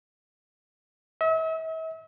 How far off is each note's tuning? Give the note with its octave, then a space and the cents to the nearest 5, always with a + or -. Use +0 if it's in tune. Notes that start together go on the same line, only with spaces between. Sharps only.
E5 -40